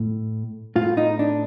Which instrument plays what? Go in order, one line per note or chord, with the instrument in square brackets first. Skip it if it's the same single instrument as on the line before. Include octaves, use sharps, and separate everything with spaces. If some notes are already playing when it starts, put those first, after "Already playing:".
Already playing: [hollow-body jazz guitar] A2
A2 F4
D#4
D4